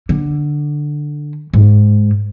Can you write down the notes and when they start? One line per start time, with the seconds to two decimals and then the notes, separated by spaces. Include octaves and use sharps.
0.09 D3
1.53 G#2